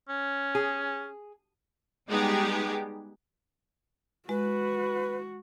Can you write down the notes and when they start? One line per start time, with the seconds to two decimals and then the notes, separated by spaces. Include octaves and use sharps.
0.09 C#4
0.55 G#4
2.07 G3 G#3 B3 D#4 G4 G#4
4.29 G#3 F#4 B4